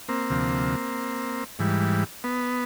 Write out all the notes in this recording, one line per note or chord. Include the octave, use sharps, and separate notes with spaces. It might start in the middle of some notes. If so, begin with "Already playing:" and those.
A#3 C4
D2 C3 F3
G#2 E3 G3
B3